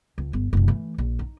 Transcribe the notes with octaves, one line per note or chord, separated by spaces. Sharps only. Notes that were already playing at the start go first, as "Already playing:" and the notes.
C#2
G1
F#1 C2
E3 A3
A#1
D#4